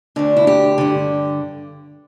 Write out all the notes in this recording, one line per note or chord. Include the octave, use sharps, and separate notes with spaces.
D2 D3 D4
E4
G4
G2 D3